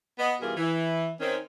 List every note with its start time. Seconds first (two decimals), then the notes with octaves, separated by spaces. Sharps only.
0.19 B3 D#5
0.41 B2 E3 G3 F4 G#4 A#4
0.56 E3
1.20 D#3 C4 C#4